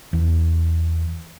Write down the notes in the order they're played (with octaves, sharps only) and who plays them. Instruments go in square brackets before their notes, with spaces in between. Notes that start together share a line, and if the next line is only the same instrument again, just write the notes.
[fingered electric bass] E2